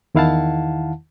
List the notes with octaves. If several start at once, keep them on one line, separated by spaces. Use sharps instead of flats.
E2 D#3 E4 F5 F#5 A5